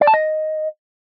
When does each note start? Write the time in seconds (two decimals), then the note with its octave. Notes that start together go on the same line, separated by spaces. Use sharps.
0.01 D5
0.07 A5
0.14 D#5